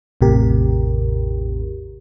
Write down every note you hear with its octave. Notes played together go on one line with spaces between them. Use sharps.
A1 E2 A2 C3 G4 A#4